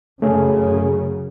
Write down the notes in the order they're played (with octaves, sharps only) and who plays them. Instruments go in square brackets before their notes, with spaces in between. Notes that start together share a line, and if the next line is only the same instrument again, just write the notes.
[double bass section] F#2 C#3 [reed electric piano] A3 C#4 G#4